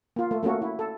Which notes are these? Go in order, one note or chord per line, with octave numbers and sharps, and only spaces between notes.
A#3 F4
A3
A3 A#3 C#4 F#4
E4
A4